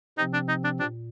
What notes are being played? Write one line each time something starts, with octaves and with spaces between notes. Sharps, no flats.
C3 F3 C4 D#4
D4
D#4
D4
A#2 D4